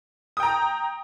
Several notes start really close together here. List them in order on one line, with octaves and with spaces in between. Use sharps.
D#6 G5 A#5